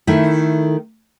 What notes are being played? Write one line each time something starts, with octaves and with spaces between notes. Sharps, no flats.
D#3 A3 E4